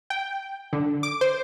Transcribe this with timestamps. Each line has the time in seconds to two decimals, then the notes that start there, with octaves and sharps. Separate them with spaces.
0.10 G5
0.73 D3
1.03 D6
1.21 C5